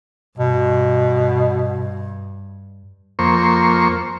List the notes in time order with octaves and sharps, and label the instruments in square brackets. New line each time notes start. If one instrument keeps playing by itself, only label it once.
[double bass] G2 [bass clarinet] B2
[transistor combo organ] F2 A#3 C5 C#6